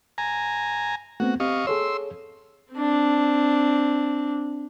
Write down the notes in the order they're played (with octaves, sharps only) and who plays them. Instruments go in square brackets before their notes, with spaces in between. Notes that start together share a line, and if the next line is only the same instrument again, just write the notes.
[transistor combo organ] G#5 A#5
[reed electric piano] A3 B3 C4 [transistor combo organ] F#4
[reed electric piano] C4 G4 [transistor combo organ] D#5 F5 C#6
[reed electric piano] G#4 A4 C#5 [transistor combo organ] C6 E6
[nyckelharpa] C4 D4